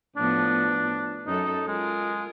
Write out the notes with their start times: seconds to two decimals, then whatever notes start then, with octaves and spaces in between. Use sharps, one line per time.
0.17 A2 F3 B3 D4
1.26 F#2 D#4 A4
1.68 G#3 F4 A#4